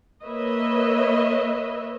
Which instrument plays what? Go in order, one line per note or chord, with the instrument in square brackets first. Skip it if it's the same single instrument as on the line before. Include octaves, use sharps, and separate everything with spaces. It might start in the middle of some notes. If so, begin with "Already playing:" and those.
[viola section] A#3 B4 C#5 D#5 E5